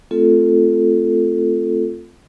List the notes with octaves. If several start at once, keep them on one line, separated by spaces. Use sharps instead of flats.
A3 C4 F4 A4